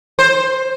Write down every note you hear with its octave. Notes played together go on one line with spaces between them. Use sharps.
C5